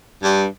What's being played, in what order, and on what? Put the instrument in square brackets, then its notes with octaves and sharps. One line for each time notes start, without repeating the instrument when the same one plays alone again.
[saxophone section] G2